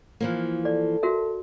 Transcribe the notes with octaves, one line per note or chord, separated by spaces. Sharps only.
E3 F3 A#3
A4 D5
F#4 A#4 E5